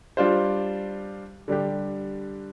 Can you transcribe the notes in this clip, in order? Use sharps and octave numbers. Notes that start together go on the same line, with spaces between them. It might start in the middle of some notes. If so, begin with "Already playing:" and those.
G3 D4 F4 C5
D3 G3 D4 G4